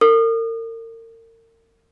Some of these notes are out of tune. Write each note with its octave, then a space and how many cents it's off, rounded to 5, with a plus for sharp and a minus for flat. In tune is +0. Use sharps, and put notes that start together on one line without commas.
A#4 -40 D#6 -35